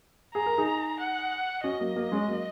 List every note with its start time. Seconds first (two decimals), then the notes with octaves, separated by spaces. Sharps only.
0.34 G#4 A#5
0.46 A#4
0.58 D#4 G#4
0.99 F#5
1.64 C#4 F#4 D#5
1.80 F#3 A#3
1.96 F#3 A#3
2.12 G#3 C#4
2.28 F#3 A#3